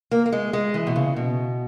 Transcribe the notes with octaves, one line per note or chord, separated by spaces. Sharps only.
A#3
A#3
G#3
G#3
E3
B2
C#3
B2